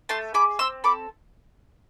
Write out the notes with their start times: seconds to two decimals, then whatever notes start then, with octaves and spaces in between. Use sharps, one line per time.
0.09 A3 A5 C6
0.34 G#4 B5 D6
0.59 C4 C6 E6
0.84 A4 B5 D6